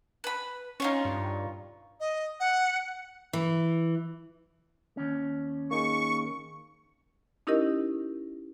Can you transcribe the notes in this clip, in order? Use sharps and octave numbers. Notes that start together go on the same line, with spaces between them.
B4 B5
C#4 D#4 F4 C#5
G2
D#5
F#5
E3
D#2 C#4
A#3 D#4 G#4 C#6
C#4 D#4 E4 G4 A#4 D#5